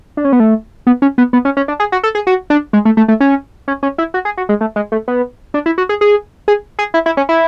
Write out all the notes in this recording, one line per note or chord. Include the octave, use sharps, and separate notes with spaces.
D4
C#4
B3
A3
B3
C#4
B3
B3
C#4
C#4
D4
G#4
F#4
A4
G#4
F#4
D4
G#3
A3
A3
A3
C#4
C#4
C#4
E4
F#4
G#4
F#4
G#3
A3
G#3
A3
B3
D4
E4
F#4
G#4
G#4
G#4
G#4
E4
E4
C#4
E4